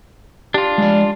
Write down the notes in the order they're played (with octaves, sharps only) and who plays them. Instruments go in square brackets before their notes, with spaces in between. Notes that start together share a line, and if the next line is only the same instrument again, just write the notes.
[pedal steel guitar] D4 F4 [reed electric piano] G4
[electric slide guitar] G#3 D5